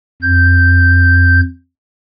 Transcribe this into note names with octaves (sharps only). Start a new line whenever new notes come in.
F2 G6